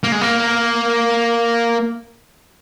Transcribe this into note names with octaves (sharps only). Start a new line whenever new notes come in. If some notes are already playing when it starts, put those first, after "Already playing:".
A#3
G#3
A#3